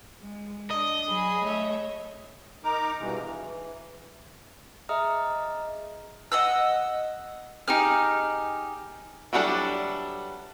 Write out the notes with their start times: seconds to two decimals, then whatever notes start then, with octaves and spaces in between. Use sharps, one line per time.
0.20 G#3
0.71 D4 D#5
1.07 F#3 G#4 B5
1.43 A3 C#5 E5
2.64 D#4 A#4 A#5 D6
3.00 G2 B2 E3 G#3
3.22 E3
4.89 G#4 D#5 E5 A#5 D#6 F6
6.32 D#5 F#5 E6
7.68 D#4 G4 G#4 F6
9.33 E3 F#3 G3 D4 A4